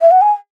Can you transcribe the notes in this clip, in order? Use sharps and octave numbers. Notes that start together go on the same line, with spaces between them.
E5
F#5
G#5